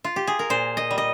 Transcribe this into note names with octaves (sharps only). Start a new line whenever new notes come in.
F4
G4
G#4
A#4
A#2 C5
D#5
G3
D#5